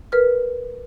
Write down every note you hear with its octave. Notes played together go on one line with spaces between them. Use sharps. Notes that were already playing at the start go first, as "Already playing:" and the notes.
A#4 B4 F6